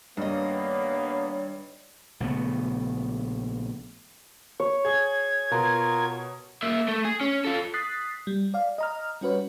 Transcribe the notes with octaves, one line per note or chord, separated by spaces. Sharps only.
G2 D#3 A#3 B3 C#5 D#5
A#1 C#3 A3 B3
C#5
G#4 G#6
B2 F4 A#4
A#3 E5
A3
G#4
C#4
F4 A4
D#6 F#6 A6 B6 C7
G3
D5 F5
D#5 A#5 F6
G3 C#4 F#4 B4 C#5